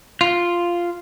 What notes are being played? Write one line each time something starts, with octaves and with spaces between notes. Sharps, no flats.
F4